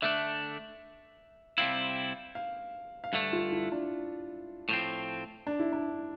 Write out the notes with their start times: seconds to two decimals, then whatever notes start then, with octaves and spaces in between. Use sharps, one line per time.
0.02 D3 A3 D4 E5
1.58 C3 G3 C4 E4 F5
2.35 F5
3.04 F5
3.13 G2 D3 A3 E5
3.33 F4
3.52 E4
3.72 D4
4.69 A2 F3 C4
5.47 D4
5.59 E4
5.73 D4